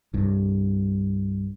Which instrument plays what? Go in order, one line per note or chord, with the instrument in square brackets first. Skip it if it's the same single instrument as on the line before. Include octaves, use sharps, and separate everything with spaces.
[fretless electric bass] C2 G2